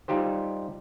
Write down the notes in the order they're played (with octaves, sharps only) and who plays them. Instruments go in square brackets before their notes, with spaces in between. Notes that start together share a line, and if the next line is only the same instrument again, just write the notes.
[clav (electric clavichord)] G3 D#4 F4 G4 C5